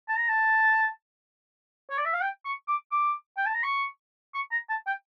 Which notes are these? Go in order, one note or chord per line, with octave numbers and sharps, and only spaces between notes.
A5
A#5
A5
C#5
D5
E5
F5
G5
C#6
D6
D6
G5
A5
A#5
C#6
C#6
A#5
A5
G5